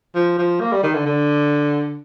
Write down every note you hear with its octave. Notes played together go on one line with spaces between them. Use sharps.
F3
F3
A#3
G3
D#3
D3
D3